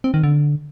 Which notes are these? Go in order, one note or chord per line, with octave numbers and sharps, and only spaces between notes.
C4
D#3
D3